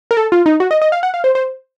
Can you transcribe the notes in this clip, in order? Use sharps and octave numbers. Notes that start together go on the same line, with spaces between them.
A#4
A4
F4
D#4
F#4
D#5
D#5
F5
F#5
F5
C5
C5